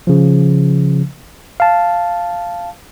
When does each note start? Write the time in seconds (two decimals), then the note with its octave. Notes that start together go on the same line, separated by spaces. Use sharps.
0.07 C#3 F3
1.60 F5 A5